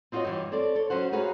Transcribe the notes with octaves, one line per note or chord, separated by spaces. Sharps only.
C4 D#4 F4 F#4 C#5 D#5
G2 E3
C4 A4 C#5 D5
A4 C#5
F#3 C#4 C5 F#5
D#4 F#4 G#4 B4 C#5 F5